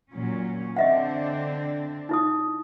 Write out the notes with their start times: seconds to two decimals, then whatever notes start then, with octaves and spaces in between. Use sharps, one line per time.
0.12 A#2 F#3 C#4
0.77 D3 C4 D4 D#5 E5 F#5
2.09 D#4 E4 D#6